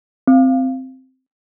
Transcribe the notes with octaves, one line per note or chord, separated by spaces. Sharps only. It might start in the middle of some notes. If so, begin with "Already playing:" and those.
C4